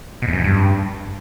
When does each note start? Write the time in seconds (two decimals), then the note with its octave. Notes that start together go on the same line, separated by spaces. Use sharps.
0.22 B2
0.28 E2
0.33 F#2
0.39 F2
0.44 G2